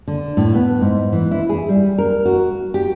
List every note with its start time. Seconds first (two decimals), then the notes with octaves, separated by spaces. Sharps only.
0.08 D3
0.37 A2
0.54 B3
0.81 G#2
1.12 E3
1.31 E4
1.49 G#4
1.69 G3
1.98 A#4
2.25 F#4
2.74 G4